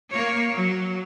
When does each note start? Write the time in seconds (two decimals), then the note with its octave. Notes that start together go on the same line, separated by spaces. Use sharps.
0.11 A#3 C#5
0.54 F#3